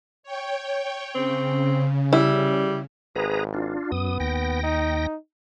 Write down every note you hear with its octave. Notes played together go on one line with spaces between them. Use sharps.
C#5 G5
C#3 C4
G3 E4
G#1 G#4 B4 A#5
D4 F4
F#2 B3 D#6
D#2 G5 A#6
D#4